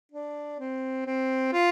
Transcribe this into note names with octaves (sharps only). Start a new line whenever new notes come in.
D4
C4
C4
F4